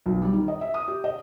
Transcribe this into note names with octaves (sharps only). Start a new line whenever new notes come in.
B1
G3
D#3
D#5
E5
D#6
G4
D#5